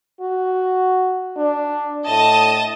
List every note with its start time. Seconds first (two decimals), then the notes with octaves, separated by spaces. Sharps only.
0.20 F#4
1.37 D4
2.08 A2 D#5 A5 D#6